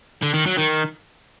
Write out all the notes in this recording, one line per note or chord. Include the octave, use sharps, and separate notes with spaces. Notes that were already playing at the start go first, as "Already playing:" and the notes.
D3
D#3
F#3
D#3